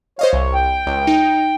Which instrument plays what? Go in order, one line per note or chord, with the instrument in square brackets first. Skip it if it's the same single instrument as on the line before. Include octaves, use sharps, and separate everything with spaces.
[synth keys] C5 D#5 F5 [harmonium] C#5
[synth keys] C2
[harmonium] G5
[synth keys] C#2
D#4